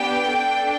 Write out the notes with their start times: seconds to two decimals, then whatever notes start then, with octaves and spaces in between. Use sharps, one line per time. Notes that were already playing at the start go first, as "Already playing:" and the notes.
Already playing: B3 D4 G4 G5
0.27 A4
0.32 D4